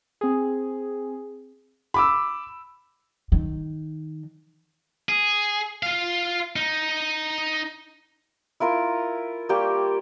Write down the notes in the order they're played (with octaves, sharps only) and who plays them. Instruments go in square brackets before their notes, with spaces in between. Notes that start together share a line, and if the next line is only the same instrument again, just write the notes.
[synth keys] C4 G#4
[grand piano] B5 D6 E6
[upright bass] D#3
[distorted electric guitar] G#4
F4 F5
D#4
[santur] E4 F4 A#4
G3 A#3 G4 C#6